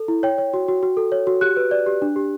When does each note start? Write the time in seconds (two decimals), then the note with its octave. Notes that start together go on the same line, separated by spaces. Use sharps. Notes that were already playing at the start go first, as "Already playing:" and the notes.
Already playing: A4
0.08 E4
0.23 C#5 G5
0.38 C#5
0.54 F#4
0.68 F#4
0.83 F#4
0.97 A4
1.12 C#5
1.27 F#4
1.41 G4 F#6
1.57 B4
1.71 D5
1.86 G4
2.02 D4
2.16 G4